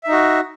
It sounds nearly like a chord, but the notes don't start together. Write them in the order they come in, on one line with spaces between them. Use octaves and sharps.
E5 D#4 F#4